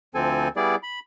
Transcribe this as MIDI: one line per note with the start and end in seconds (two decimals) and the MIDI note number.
0.15 0.48 38
0.15 0.48 53
0.15 0.48 60
0.15 0.48 69
0.15 0.48 80
0.56 0.75 55
0.56 0.75 59
0.56 0.75 64
0.56 0.75 68
0.56 0.75 74
0.83 0.99 83